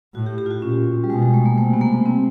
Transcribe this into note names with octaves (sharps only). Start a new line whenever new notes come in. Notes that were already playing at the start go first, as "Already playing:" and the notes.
A2 F#4
G4
G4
F4
F#4
A#2 C#4
G3
B2 G#3
G#3
A3
A#3
C3 A3
B3
A#3
C4